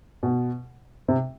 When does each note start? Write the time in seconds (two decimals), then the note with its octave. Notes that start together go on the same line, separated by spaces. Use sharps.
0.23 B2
1.08 C3